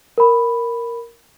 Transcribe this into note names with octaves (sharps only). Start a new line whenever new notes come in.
A#4 B5